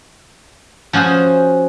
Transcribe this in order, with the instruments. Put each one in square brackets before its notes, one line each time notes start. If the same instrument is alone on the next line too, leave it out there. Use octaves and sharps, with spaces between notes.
[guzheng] F3 C#4 F#4 G#4 C5